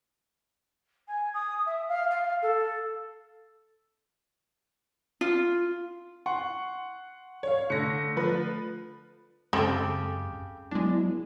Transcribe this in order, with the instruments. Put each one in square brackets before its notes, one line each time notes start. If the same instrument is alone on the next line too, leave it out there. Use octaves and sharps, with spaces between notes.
[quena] G#5
D#6
E5
F5
F5
A4
[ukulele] F4
[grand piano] F#5 C6 C#6
[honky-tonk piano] C#5 F5
[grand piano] D3 A3 [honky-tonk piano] A#6 C#7
[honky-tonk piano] F3 B4
[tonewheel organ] F#2 [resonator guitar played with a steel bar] C#3 G4 [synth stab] G#3 A4 [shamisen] C4 B5
[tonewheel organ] F#3 B3 E4 [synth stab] G#3 D4